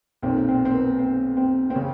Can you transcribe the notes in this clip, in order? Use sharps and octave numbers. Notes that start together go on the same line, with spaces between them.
B1 A#2 C4
C4
C4
B3
C4
C4
C4
C#3 C#4